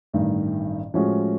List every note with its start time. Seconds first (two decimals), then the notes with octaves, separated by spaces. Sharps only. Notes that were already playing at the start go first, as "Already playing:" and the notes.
0.13 A1 G2 D#3
0.94 A2 F3 G#3 C#4 F#4